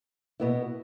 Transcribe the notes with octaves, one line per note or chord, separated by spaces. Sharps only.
B2 B3 E4